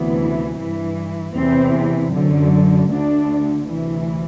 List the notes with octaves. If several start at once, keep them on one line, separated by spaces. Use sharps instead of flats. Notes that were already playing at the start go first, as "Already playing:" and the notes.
Already playing: D2 C3 E3 B3
G2 E3
E2 C3 E3 C4
F#2 D3
D2 D3 D4
D2 C3 E3